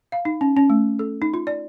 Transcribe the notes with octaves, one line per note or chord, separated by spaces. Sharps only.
F5
D#4
C#4
C#4
A3
A4
D#4
F4
D5